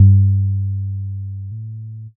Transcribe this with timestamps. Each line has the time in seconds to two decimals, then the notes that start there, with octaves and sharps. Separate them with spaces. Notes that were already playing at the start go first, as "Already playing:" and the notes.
Already playing: G2
1.52 A2